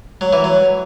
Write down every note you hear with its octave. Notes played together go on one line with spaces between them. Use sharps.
F#3
E3
F#3